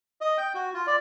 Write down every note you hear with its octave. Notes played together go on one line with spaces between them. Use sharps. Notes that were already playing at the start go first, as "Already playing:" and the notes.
D#5
G5
F#4
F4
D5